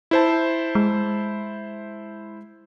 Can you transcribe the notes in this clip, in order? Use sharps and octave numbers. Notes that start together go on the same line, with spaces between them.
E4 C5 A5
G#3